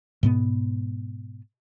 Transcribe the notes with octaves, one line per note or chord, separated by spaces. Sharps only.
G#2 B2 B3